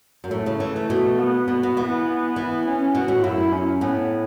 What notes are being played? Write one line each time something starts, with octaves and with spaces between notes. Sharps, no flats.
F#2
A2 A3
C#3
E3
E3
B2
B3
B2 B3
B2
E3 B3
E3
C#4
B2 F#4
A2
F#2 E4
C#4
A2 B3